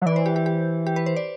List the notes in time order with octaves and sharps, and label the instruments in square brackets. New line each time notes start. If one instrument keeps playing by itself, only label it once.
[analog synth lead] F#3
[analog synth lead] E3 [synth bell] D5
[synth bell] C5
G4
G4
G4
G4
B4
C5
D5